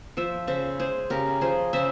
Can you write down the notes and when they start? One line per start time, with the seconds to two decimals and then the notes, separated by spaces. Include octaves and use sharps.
0.17 F3 C5 E5
0.47 C#3 C5 E5
0.80 G#3 G#4 C5
1.10 C#3 G4 A#4
1.41 F3 G#4 C5
1.73 C#3 C5 E5